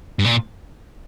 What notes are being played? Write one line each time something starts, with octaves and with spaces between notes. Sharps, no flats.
G2
A#2